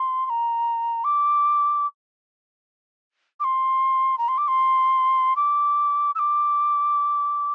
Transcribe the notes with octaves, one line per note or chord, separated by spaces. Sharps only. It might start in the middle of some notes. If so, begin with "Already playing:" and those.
Already playing: C6
C6
A#5
D6
D6
C6
A#5
C6
D6
C6
D6
E6
D6